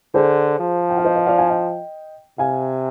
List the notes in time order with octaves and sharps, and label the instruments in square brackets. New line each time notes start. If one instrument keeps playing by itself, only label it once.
[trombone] D3 [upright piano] G#4 C5
[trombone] F3
[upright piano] G5
F5
C5 D#5
C5 D#5
D5 F5
F5 G#5
D#5 G5
[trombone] C3 [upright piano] F5 G#5